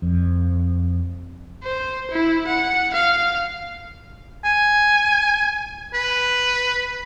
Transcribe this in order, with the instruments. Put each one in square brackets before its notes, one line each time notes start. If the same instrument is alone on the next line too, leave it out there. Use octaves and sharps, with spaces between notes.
[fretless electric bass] F2
[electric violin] C5
E4
F#5
F5
[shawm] G#5
B4